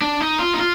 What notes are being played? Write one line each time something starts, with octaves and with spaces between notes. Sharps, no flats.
D4
D#4
F4
D#4
F4